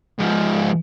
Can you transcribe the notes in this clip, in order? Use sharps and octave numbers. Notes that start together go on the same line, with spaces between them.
G#2 F3